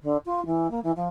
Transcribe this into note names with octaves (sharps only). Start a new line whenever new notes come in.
D3
F4
E3
A#3
E3
F3